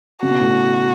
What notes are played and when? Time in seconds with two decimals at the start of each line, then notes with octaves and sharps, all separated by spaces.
0.23 C#3 F#4
0.30 B2
0.40 A2
0.49 B2